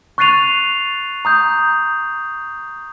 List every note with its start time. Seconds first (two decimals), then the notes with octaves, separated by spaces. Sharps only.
0.18 C#6 F#6 A6 C7 D#7 F7
1.25 A#5 D#6 G6